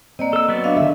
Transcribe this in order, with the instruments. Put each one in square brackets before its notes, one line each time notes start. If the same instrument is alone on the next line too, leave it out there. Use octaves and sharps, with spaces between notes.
[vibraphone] A#3 D5 D#5 [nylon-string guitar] C4
[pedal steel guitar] A4 E6
F#3 B3 D5
[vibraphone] D4 D#5 F5
[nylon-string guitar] D3 D#3 E5